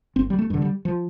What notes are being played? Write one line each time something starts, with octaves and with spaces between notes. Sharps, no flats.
G1 C4
G3
A3
G2 D3
G3
F3